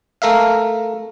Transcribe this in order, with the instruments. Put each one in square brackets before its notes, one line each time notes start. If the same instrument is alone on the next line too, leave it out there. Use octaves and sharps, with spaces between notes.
[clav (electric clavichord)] A3 A#4 E5 F5